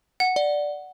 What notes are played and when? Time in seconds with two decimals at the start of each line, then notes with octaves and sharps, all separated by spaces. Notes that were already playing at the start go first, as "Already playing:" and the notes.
0.20 F#5
0.36 D5